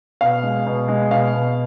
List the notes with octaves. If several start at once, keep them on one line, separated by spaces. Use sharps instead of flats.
B2 F5
G#3
B2
G#3
B2 F5
B2